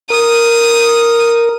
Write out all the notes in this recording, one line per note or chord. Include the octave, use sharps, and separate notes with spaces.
A#4 D#6